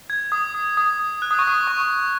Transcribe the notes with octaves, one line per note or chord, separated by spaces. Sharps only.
G#6
D#6
D#6
D#6
F#6
D#6
C#6
D#6
C#6